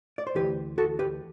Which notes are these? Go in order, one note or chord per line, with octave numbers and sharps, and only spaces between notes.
D5
C5
D2 C3 E3 G4 B4
F#4 A4
G4 B4